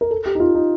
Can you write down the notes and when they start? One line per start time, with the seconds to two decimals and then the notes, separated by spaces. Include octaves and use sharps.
0.01 A#4
0.11 A4
0.26 G4
0.35 D#4
0.40 F4
0.55 D#4